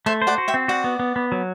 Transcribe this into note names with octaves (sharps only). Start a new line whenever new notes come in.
A3 C5 E5
C5
D5 F#5
F#4
E5 G5
C4
F#4 D5 F#5
B3
B3
B3
F#3